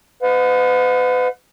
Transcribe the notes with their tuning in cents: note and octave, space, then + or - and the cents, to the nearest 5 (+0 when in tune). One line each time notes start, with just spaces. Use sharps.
B4 +40 D#5 -10 F#5 -40